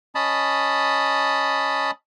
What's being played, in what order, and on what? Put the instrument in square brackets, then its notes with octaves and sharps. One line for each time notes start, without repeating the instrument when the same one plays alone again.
[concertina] C#4 D#5 A5 B5